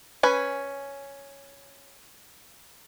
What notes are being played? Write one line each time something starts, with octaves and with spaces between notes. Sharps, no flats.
C#4 B4 G#5